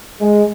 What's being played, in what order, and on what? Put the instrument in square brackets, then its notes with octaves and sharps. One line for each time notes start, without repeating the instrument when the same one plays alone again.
[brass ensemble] G#3